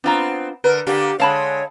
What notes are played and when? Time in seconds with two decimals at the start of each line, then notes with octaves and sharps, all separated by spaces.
0.04 B3 C4 D4 F4 A#5
0.64 D3 A#4 B4
0.87 D3 A#3 D4 G4
1.20 D3 G#3 C#5 F5 A5 B5